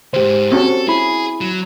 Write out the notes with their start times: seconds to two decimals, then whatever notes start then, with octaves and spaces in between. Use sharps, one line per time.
0.13 D2 G#2 G4 C5
0.52 C4 C#4 F#4 A4
0.88 E4 G#4 B5
1.41 F#3